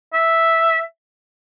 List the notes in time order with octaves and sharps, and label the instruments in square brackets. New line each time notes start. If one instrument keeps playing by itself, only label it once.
[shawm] E5